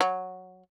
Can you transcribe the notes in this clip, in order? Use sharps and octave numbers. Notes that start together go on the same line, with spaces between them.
F#3